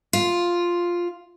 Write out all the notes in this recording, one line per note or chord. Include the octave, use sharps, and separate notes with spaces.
F4